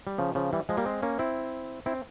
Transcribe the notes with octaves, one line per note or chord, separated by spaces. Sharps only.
G3
C#3 F3
C#3 F3
E3 G3
F3 G#3
G3 A#3
G#3 C4
A#3 C#4
C4 E4
C4 E4